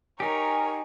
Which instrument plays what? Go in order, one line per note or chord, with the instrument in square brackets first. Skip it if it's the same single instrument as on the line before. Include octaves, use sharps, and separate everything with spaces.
[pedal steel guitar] D#4 G4 [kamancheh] A#4 C#5 [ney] G#5